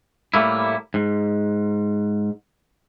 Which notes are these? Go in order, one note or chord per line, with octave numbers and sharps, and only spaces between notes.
A2 G3 A3 A#3 E4
G#2